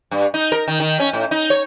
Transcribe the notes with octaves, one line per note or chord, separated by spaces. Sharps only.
G2
D#4
A#4
D#3
D#3
C#4
A2
D#4
C#5